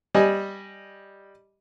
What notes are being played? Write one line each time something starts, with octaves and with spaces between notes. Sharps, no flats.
G3 D#5 G#5